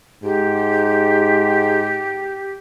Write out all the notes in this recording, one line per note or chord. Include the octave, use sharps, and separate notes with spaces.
G#2 G4